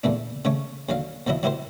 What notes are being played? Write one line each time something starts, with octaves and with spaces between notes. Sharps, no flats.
E2 A#2 A3 D4
C#3 A3 C#5
D#2 D3 F#3 F5
D#2 F3 F#3 E4 D#5
F#3 E4 G4 A#4 C5